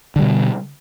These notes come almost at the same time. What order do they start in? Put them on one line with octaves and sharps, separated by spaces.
D3 G3 B2